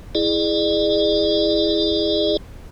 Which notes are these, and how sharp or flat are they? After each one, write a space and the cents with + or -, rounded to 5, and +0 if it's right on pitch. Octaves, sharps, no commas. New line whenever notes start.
E4 +0 G#4 +0 D5 +40